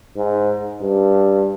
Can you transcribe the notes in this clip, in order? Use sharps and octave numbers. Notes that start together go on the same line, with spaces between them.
G#2
G2